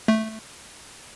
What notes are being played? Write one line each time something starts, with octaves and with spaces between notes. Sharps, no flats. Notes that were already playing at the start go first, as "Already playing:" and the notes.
A3